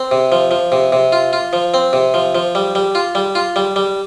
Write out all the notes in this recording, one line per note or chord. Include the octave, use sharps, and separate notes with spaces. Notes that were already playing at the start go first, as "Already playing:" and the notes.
Already playing: C4
C3
F3
F3
C3
C3
F4
F4
F3
C4
C3
F3
F3
G3
G3
F4
G3
F4
G3
G3